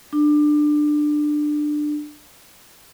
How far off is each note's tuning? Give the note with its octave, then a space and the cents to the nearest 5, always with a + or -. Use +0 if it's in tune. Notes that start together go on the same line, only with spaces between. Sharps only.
D4 +20